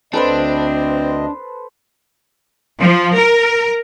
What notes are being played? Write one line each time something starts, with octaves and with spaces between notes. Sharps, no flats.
D2 C4 D4 A4 B4 C5 D#5
F3
A#4